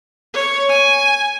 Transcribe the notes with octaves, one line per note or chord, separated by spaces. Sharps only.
C#5
G#5